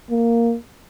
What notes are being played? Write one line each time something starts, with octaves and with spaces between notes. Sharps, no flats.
A#3